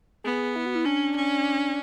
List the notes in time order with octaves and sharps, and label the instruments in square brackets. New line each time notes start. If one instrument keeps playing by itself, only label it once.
[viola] B3 [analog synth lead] G#4
[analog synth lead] E4
F#4
E4
[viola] C#4 [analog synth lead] D4
[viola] C#4